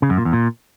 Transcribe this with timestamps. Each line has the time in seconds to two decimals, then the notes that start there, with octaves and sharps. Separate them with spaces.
0.02 C#3
0.10 F#2
0.18 A#2
0.25 E2
0.33 A#2